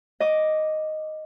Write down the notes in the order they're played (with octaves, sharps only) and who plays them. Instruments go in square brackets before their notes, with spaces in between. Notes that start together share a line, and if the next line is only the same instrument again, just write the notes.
[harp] D#5 D6